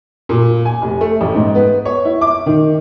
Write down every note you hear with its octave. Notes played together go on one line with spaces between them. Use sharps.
A#2
G#5
F1
A3
A1
G#2
B3
C#5
E4
D6
D#3